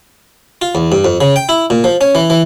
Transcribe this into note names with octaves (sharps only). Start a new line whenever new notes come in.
F4
E2
G2
F2
C#3
G5
E4
A#2
F3
C#4
E3
E3